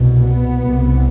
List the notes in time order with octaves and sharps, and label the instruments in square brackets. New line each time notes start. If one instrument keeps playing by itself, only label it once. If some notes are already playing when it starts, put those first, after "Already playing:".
Already playing: [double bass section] C2 B2
B3
C2 C3